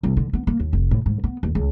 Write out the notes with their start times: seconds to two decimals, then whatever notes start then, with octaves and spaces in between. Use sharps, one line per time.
0.03 C2
0.17 D3
0.33 B3
0.47 A#3
0.60 D#2
0.73 F1
0.91 A2
1.06 G#2
1.24 B3
1.43 D#2
1.55 C#2